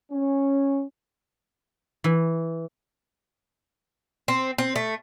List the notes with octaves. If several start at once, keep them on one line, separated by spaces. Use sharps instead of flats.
C#4
E3
C4
C4
A3